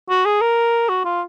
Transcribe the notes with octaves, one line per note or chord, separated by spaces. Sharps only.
F#4
G#4
A#4
F#4
F4